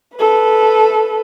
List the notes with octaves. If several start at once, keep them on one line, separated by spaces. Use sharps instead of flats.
A4 B4